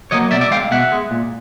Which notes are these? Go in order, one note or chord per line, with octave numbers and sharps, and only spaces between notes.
F#3 A#3 C#5 D#5
B2 D5 E5
D5 E5
G#3 F5 G5
B2 E5 F#5
G#3
A#2